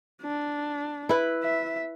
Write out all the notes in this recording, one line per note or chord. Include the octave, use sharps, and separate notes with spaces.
D4
E4 B4
E5